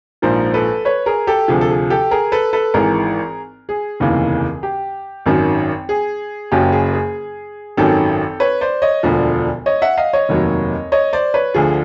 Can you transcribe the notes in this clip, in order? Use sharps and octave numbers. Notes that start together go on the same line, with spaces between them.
A#1 G#2 F3 A#4 C5
A4 B4
B4 C#5
G#4 A#4
G4 A4
D2 C3 F3 G#4
A4
G#4
G4 A4
G#4 A#4
A4 B4
A4 B4
G#1 G#2 E3 G#4 A#4
G#4
F1 D#2 C#3 E3
G4
G#1 F#2 D#3 F#3
G#4
F#1 F#2 C#3 F#3 G4
G#4
G#4
G#1 F#2 D#3 F#3 G4 A4
B4 C#5
C5 D5
C#5 D#5
E1 D2 D3 F3
C#5 D#5
E5 F#5
D#5 F5
C#5 D#5
F1 D#2 D#3 F#3
C#5 D#5
C5 D5
B4 C#5
D2 D3 F3 G#4